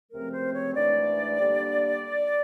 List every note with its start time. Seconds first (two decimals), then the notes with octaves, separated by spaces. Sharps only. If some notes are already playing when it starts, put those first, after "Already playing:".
0.11 C#2 C3 F3 A3 C4 A#4
0.32 C5
0.53 C#5
0.75 G#2 E3 A3 D4 D5
1.39 D3 G3 A#3 D4